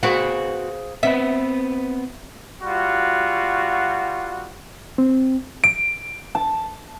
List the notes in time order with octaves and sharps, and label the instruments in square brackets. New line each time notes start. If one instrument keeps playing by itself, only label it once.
[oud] C4 F#4 B4 [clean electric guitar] G#4 C5 F5
[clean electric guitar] B3 C4 B4 [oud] E5
[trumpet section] G3 F4 F#4
[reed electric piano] C4
[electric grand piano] D7
[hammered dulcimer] A5